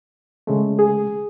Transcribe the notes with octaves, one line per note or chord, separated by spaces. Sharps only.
C#3 G#3 A3
G#4